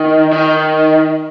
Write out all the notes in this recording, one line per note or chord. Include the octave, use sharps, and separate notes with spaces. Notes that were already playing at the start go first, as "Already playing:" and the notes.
Already playing: D#3
D#3